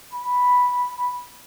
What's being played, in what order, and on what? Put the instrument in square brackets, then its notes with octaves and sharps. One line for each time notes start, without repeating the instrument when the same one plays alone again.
[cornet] B5